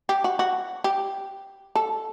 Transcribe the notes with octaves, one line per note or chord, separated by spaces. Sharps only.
G4
F#4
F#4
G4
A4